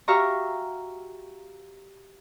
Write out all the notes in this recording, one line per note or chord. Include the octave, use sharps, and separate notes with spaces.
F#4 G4 E5 F5 A#5 C#6